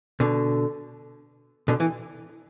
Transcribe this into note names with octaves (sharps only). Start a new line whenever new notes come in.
B2 D3
B2 D3
E3